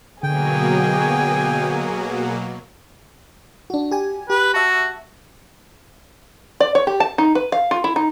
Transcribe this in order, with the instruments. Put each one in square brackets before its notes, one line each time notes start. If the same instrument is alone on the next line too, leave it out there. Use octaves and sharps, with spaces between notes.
[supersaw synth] B2 F#3 A#3 [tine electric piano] D3 [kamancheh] G#4 G#5 [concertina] G5
[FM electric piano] D4 F#4
G4 G#5
[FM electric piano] G4 [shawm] B4
[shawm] F#4 [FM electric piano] E5 A5
[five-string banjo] D5
C#5
G4
A5
D#4
B4
F5
F4
E4
D#4